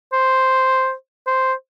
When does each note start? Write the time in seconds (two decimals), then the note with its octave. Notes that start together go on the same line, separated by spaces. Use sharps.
0.13 C5
1.27 C5